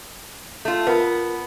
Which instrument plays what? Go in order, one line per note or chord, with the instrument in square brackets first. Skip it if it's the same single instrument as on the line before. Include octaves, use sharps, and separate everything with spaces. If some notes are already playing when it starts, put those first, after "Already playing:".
[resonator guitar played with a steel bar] A3 F4
[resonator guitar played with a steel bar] B3 [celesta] F4 A#4 B4